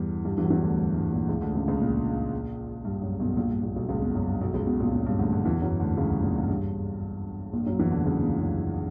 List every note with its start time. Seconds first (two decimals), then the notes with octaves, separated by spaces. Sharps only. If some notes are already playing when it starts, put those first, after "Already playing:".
Already playing: E2 G2 B2 E3 G3 B3
0.25 G2 G3
0.38 E2 E3
0.45 F#3
0.50 E2 E3
0.63 D2 D3
0.77 G2
0.94 G2
1.12 A#1 A#2
1.28 C#2 C#3
1.41 D2 D3
1.54 C#2 C#3
1.68 C#2 C#3
1.81 A#1 A#2
2.85 G2
3.02 F#2
3.20 B1 B2
3.37 A#1 A#2
3.50 G2
3.63 A#1 A#2
3.76 B1 B2
3.88 C#2 C#3
4.01 B1 B2
4.15 F#2
4.28 G2
4.41 B1 B2
4.54 C#2 C#3
4.67 B1 B2
4.80 A#1 A#2
4.93 A#1 A#2
5.07 G2
5.19 D2 D3
5.32 D2 D3
5.45 E2 E3
5.62 F#2 F#3
5.80 D2 D3
5.97 C#2 C#3
6.10 G2
6.23 A#1 A#2
6.36 G2
6.49 G2
7.53 A#1 A#2
7.66 F#2 F#3
7.79 E2 E3
7.92 D2 D3
8.05 C#2 C#3
8.22 A#1 A#2
8.40 F#2